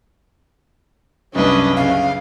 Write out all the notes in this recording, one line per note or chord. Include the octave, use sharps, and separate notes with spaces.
C2 F#2 C#4 D4 B4 D#5
C#3 F5